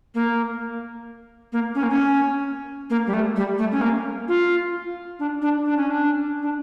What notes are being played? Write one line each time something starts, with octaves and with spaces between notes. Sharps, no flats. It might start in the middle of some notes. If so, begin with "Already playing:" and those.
A#3
A#3
C#4
A#3
C#4
A#3
G3
A3
G3
A3
C#4
A#3
F4
D4
D4
D4
C#4
D4
D4